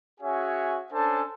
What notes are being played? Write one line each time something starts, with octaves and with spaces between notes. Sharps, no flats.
C#4 F#4 G#4 C#5 E5 G#5
C#4 D4 A4 C5 G#5 A5